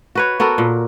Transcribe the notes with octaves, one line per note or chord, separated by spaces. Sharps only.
F#4 B4 C#5
B3 F#4 A4 A#4
A#2